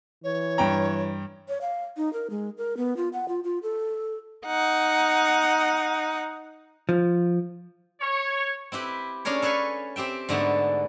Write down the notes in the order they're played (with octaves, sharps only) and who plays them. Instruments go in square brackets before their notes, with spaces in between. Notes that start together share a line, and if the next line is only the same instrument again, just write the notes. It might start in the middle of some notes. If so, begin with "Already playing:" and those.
[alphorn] E3 [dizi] C#5
[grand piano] G2 G5 A#5
[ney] C#5
F5
D#4
A#4
G#3
A#4
B3
F4
F#5
F4
F4
A4
[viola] D#4 F#5
[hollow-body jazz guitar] F3
[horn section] C#5
[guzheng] C4 E4 G4 B4
C#4 D4 G#4 A#4 C#5
A4 B4 C#5 F5 G#5
C4 G4 E5 G5
G#2 D3 A3 B3